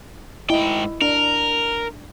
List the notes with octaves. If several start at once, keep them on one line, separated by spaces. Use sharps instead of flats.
G#2 E4 D#5 G5
D4 A#4